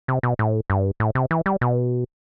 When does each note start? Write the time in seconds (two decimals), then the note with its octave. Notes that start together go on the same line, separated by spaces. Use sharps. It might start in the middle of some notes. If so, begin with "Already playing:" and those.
0.08 C3
0.23 B2
0.39 A2
0.70 G2
1.00 A2
1.15 C3
1.31 E3
1.46 G3
1.61 B2